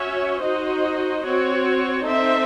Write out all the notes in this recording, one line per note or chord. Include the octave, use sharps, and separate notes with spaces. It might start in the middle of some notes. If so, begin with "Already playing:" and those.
Already playing: C#4 F#4 C#5 E5
D#4 F#4 C5 D#5
C4 F#4 C#5
C4 D#4 A4 C5 E5